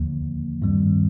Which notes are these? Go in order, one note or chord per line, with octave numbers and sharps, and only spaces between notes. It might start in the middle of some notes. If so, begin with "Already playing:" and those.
Already playing: D#2 D3 F3 A#3
G2 D#3 G3 C4